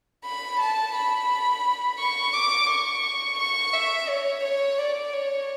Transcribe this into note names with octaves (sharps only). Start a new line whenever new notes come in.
B5
A5
B5
C#6
D6
C#6
C#6
E5
C#5
C#5
D5
C#5